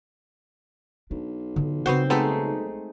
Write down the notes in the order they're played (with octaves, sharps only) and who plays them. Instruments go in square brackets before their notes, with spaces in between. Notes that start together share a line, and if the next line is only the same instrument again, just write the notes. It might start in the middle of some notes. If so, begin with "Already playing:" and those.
[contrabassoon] B1 [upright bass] D4
[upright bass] D3 F4
[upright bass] C#3 [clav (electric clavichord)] B3 F#4 F#5 [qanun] C4 C5
[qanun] G#3 A3 D#4 [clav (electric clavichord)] B3 C4 A4